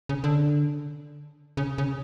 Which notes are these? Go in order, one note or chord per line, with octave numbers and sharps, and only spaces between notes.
C#3
D3
C#3
C#3